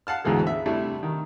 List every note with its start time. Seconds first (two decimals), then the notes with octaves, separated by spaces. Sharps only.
0.07 F5 F#5 A5 F6
0.24 D2 G#2 B2 E3 G#3
0.47 E5
0.66 C3 G3 A3 D4 E4
1.03 D#3